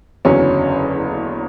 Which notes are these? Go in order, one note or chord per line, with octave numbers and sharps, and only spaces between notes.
F#1 E2 D3 F#3 C#4